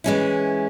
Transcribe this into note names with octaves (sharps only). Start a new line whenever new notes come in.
E3 G#3 C#4 E4